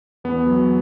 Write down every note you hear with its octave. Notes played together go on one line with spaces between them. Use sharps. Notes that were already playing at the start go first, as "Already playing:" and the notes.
E2 B3
F#3